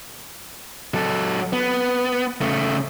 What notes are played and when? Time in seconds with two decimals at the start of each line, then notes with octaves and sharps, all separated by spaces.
0.94 F#3 A4
1.53 B3
2.41 C#3 A3